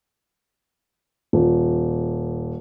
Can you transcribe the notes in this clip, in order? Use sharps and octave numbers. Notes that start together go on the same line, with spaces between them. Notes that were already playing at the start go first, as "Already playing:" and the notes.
D#1